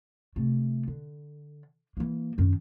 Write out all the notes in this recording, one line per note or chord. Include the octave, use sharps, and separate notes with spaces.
C3 A3
D3
E3 A#3
F#2 D#3